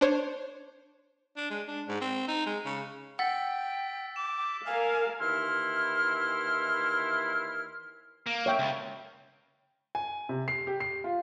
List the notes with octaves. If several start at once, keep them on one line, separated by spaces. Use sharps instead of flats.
D4 C5 C#5
D4
G#3
D4
G#2
C4
D#4
G#3
C#3
F#5 G5 E6 A6 B6
D6 E7
A#4 F5 G#5
D#2 E3 E4 C6 F6
A#3
C#5 E5 G5
C#2
G#5
C3
C7
G4
C7
F4